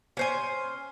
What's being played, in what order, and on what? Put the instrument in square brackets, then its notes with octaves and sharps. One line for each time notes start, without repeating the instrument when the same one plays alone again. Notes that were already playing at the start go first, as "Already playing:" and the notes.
[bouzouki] C#4 C5 G#5